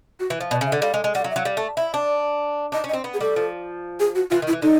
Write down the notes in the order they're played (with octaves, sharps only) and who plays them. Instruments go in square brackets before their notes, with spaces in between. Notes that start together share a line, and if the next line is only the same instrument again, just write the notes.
[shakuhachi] F#4
[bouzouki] E3
F3
[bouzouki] B2 [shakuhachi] D5
[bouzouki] C#3
[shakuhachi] E5
[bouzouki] D3
[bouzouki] G3 [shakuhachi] F5
[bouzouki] G#3
G#3
[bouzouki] G3 [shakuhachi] F#5
[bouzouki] F#3 [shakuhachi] F5
[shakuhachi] E5
[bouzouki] F#3 [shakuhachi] F5
[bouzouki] G3
A3
[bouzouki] E4 [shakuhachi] E5
[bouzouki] D4 [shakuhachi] D5
[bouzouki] D4 [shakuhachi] D#5
[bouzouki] C#4
[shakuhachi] D#5
[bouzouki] C4
B3
[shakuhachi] G#4
[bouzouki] G3 [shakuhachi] A4
[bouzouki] F3
[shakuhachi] G#4
F#4
[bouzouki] E3 [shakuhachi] F4
[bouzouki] D#3
[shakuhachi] E4
[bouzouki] E3
[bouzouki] D3 [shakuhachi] D#4